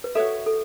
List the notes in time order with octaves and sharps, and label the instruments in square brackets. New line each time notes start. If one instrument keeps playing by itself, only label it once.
[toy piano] B4
[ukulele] F#4 C#5 E5 [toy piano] A4
[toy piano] A4